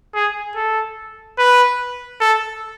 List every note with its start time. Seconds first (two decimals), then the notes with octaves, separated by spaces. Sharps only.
0.14 G#4
0.56 A4
1.38 B4
2.21 A4